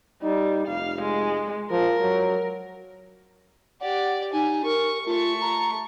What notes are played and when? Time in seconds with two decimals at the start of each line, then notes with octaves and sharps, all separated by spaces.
0.23 G3 D#4
0.68 F1 F5
1.02 G#3
1.71 F3 A#4
2.01 F#3
3.81 G4 D5 F#5
4.33 D#4 G#5
4.65 A#4 C#6
5.06 A3 F4 C#6
5.41 A#5